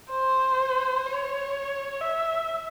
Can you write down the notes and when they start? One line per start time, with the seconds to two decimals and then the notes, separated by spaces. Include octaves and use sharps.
0.11 C5
1.06 C#5
2.01 E5